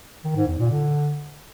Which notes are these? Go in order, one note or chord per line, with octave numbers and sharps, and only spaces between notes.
D#3
G#2
E2
A#2
D3